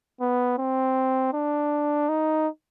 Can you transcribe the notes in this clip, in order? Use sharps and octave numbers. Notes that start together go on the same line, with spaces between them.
B3
C4
D4
D#4